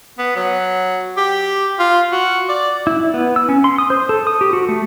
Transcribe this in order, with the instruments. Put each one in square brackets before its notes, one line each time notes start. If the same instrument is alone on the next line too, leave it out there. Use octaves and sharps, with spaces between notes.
[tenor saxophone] B3
F#3
G4
F4
F#4
D5
[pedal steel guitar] E4
B3
E6
C#4
C6
D#6
C5
A4
D#6
G4
F#4
A3